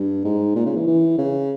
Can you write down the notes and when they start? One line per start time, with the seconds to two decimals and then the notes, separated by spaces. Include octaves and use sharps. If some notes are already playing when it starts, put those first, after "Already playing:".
Already playing: G2
0.24 G#2
0.55 A#2
0.66 C#3
0.76 E3
0.87 E3
1.18 C#3